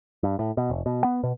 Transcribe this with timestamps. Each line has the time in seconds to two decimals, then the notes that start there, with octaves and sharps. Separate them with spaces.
0.23 G2
0.39 A2
0.57 B2
0.70 F1
0.86 B2
1.04 B3
1.23 B2